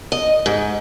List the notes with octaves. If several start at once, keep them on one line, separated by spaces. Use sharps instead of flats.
D#5
G#2